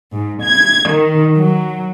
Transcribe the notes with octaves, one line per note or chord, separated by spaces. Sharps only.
G#2
G#6
D#3
F#3